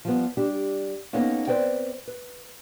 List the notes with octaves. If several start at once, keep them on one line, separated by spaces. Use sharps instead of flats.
F3 G3 B3
G3 D4 G4
A#3 B3 C#4 D#4 A4 C#5
C4 B4 C5 D5 G5
B4